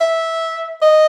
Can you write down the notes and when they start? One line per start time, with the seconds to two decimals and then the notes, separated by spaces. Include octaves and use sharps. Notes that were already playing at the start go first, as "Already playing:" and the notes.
0.01 E5
0.82 D#5